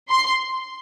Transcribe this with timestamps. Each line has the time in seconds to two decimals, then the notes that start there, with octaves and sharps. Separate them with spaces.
0.09 C6